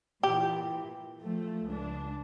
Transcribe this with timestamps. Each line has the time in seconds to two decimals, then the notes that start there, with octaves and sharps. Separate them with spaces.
0.23 A#2 E3 G4
1.20 F3 A3
1.66 C#2 D4